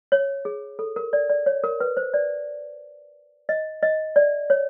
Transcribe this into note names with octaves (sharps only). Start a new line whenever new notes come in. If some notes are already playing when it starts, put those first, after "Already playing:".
C#5
G#4
A4
A#4
D5
D5
C#5
A#4
B4
C5
D5
D#5
D#5
D5
C#5